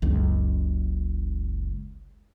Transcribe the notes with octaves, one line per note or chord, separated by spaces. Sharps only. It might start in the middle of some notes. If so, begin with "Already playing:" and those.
F#1 C#2